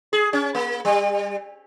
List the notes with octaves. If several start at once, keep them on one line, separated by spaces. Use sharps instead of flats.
G#4
C#4
A#3
G3